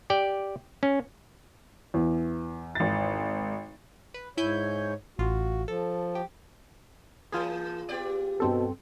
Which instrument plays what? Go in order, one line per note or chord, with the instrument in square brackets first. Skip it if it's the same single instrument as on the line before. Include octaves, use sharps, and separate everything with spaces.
[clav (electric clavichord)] G4 D5 G5
C#4
[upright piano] E2
[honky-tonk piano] G#1 A6
[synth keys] B4
[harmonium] G#2 C#5 [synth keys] E4 G#5 G6
[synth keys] A1 F4 [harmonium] F#4
[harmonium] F3 [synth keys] A4
[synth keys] G4
[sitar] E3 A#3 [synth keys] F4 G#4
[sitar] B3 G4 D5
[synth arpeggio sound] G2 C4 A4 [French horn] B2